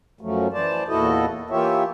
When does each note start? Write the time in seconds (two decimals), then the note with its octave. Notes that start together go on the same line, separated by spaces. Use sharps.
0.21 F#2 F3 F#3 A3 C#4
0.53 E3 C5 D5 A5
0.88 E2 A#2 E4 F#4 A4 D#5
1.50 E3 A#3 F4 G4 C#5 E5